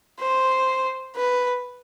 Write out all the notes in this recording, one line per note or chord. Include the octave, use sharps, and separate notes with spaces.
C5
B4